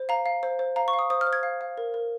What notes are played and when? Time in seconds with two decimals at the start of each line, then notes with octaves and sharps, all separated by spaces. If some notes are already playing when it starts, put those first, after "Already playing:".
Already playing: C5
0.09 F5 A#5
0.26 F5
0.43 C5
0.59 C5
0.76 F5 A#5
0.88 C#6
0.93 F5
0.99 D#6
1.10 C5 D#6
1.21 F6
1.27 C5
1.33 G#6
1.43 F5
1.61 F5
1.78 A#4
1.94 A#4